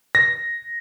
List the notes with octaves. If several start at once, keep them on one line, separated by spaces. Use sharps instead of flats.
A#6